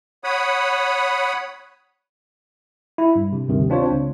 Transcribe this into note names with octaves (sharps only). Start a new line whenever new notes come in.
C#5 F#5 B5 D#6
E4
G2
C3
D2 G2 C3 D#3
C4 D4 F4 C5 C#5
C#2